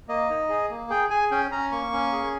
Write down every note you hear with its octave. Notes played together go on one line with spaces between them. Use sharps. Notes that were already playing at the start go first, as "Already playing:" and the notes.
A#3 D#5
D#4
G#4
A#3
G#4 G5
G#4 G#5
C#4 G5
C#4 A#5
A#3 C#6
C#4
G#4